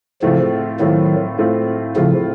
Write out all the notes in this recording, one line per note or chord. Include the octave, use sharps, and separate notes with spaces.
A2 C#3 F3 A3 C4 F4
A2 D#3 F#3 A3 C4 F4
A2 A3 C4 F4
A2 C#3 F3 A3 C4 F4